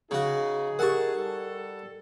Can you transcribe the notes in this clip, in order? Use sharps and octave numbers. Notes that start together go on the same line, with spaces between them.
C#3 D#4 F#4 G#4
G4 A#4 F#5 A5 C#6
G3 A4